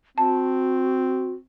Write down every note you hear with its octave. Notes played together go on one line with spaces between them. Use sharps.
C4 F#4 A5